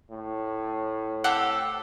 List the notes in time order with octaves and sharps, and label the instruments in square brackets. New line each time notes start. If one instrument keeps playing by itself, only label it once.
[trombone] A2
[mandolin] C4 G4 A4 [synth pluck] F#5